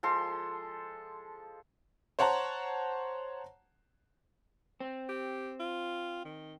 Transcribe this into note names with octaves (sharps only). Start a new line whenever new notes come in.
F3 G#3 A4 C6
C5 C#5 F#5 A5 A#5
C4
G4
F4
D#3